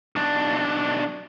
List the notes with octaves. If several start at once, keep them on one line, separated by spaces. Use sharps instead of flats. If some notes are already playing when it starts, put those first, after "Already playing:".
B1 D4